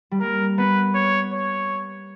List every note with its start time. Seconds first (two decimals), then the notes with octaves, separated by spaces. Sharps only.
0.11 G3
0.20 A#3 A#4
0.58 B3 B4
0.95 C#5
1.33 C#5